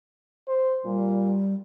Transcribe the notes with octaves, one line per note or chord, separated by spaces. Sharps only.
C5
A#2 G3